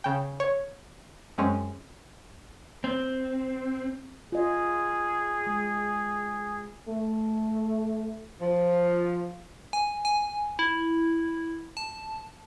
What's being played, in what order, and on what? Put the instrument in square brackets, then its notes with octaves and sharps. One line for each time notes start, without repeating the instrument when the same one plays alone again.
[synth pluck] C#3 G5
C#5
F#2 G#3 C4 C#4
[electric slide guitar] C4
[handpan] F4 D#5 [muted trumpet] G#4
[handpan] G#3
[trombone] A3
[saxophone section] F3
[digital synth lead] G#5
G#5
E4
A5